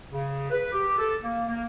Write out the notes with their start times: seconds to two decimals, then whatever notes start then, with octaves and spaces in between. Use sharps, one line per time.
0.12 C#3
0.51 B4
0.72 G4
0.98 A4
1.23 A#3
1.49 A#3